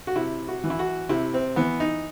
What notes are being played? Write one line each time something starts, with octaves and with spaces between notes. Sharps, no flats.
F#4
C3 E4
F#4
E3
E4
F#4
C3 E4
C4
E3 B3
D#4